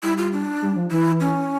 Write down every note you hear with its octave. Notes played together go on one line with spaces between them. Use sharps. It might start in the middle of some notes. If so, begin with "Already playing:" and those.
G3 E4
F4
D4
G3
F3
E3 E4
C#4